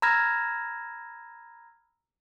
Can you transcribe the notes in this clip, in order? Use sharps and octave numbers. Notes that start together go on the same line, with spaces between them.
A#5 B5 E6 F6 G#6 A#6